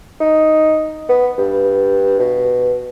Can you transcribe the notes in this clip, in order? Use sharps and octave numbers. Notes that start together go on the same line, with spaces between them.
D#4
B3
G2
B2